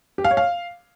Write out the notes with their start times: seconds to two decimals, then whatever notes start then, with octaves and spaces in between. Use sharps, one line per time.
0.18 G4
0.24 F5
0.31 C#5
0.37 F5